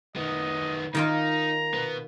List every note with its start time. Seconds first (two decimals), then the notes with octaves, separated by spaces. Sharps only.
0.16 D#3 B3 D#5
0.95 D#3 A#3 D#4 F4 A#5
1.74 B2 B3